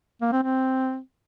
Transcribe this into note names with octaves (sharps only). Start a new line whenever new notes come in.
A#3
C4
C4